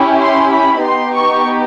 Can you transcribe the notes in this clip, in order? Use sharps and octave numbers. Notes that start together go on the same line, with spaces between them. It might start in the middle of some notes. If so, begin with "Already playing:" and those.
Already playing: C#4 E4 G4
C6
B5
B3 D#4 G4 C6
C#6